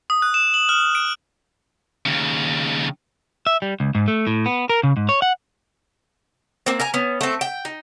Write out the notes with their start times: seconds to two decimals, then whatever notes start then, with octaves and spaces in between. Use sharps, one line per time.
0.10 D#6
0.22 F#6
0.34 E7
0.54 F#7
0.69 F6
0.95 D7
2.06 D#2 C#3
3.47 E5
3.62 G3
3.80 C#2
3.95 G#2
4.08 A3
4.27 A2
4.46 B3
4.70 A#4
4.83 C#3
4.97 G#2
5.09 C#5
5.22 F#5
6.66 A#3 C4
6.80 A#4 G#5 A#5
6.94 B3 C#4
7.21 A3 C4
7.41 G5
7.65 D#4